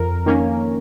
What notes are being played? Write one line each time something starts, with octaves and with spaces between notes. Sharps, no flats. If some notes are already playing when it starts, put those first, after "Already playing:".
Already playing: F2 A#4
D#3 A#3 C#4